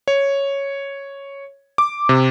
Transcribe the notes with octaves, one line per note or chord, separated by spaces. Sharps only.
C#5
D6
C3